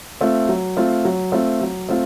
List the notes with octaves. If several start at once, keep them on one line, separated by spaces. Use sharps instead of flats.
A3 C4 F4
F#3
A3 C4 F4
F#3
A3 C4 F4
F#3
A3 C4 F4